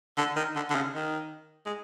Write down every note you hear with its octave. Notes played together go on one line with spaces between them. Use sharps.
D3
D#3
D3
D3
C#3
D#3
G#3